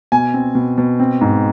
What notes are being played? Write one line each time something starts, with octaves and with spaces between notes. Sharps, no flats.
B2 G#5
C4
B2
B2
C4
G#2